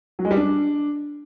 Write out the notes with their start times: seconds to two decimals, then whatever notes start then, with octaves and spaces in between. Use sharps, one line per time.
0.19 F#3
0.25 G#3
0.31 G3
0.37 D4